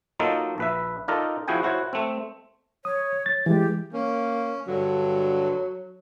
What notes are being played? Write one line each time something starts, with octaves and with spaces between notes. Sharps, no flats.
F#3 A#3 D#4 F4 A4 D#5
A#1 B4 E5
D#4 F4 A4 A#4 D5 D#5
F3 E4 F#4 G#4 G5 G#5
E4 F#4 C5 C#5
A3 C4
C#5 D#6
A6
E3 G#3 G4
A#3 C#4
G2 D3 F#3